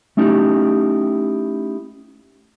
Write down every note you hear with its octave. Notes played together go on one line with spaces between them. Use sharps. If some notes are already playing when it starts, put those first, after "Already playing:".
A3 C#4 D#4 E4 G4